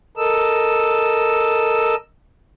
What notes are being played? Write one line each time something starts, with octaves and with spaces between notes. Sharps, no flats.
A4 A#4 D#5 E6